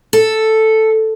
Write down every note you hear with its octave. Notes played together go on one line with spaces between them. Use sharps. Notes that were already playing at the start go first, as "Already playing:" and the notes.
A4